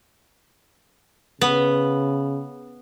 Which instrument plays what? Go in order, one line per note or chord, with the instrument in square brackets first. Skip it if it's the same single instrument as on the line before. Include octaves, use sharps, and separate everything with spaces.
[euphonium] C#3 [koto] B3